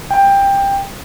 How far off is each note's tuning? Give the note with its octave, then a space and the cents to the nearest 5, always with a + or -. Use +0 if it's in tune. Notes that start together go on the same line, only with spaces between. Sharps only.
G5 +15